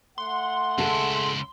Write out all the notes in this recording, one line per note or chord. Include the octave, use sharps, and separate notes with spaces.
A3 F#5 C6
C#2 E4 G#4 A4